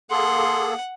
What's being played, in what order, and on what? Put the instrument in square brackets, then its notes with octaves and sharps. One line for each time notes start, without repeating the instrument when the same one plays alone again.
[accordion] A#3 G#4 A4 [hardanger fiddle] F#5 [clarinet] C6